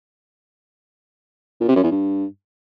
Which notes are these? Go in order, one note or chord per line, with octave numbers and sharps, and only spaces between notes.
A#2
C3
F#2
E2
G2